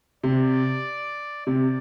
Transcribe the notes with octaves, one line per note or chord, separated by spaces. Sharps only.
C3 D5
C3 D5